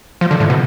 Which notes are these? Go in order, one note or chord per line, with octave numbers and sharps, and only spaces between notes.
F3
D3
A2
B2